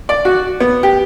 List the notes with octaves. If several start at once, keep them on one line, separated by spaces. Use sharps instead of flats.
D5
F#4
B3
G4